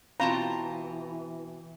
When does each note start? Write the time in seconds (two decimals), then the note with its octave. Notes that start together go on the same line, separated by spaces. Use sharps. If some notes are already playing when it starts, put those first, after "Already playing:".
0.20 B2 E3 C4 F4 A5 A#5